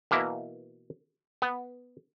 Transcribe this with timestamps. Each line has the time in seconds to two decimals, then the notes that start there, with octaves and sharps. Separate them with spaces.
0.11 B2 E3 A#3 E4
1.42 B3